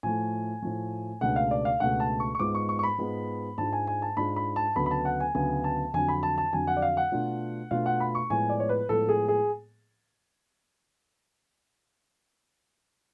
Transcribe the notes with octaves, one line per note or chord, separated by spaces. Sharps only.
A2 F3 A3 G#5
A2 F3 A3
C#2 B2 A3 D4 F#5
F5
D5
F5
C#2 B2 A3 D4 F#5
A5
C#6
C#6
G#2 G#3 B3 F4 D6
C#6
C#6
C#6
B5
G#2 G#3 B3 F4
G#2 G#3 D4 F4 A5
G#5
G#5
A5
G#2 G#3 D4 F4 B5
B5
A5
D2 C#3 F#3 B3 B5
B5
A5
F#5
G#5
D2 C#3 F#3 B3 G#5
A5
F2 D3 F#3 G#5
B5
A5
A5
F2 D3 F#3 G#5
F#5
D5
F5
F#5
B2 A3 D4 F4
B2 A3 D4 F4 F5
F#5
B5
C#6
A2 F3 G#3 B3 G#5
D5
C#5
B4
A2 F3 G#3 B3 A4
G#4
G#4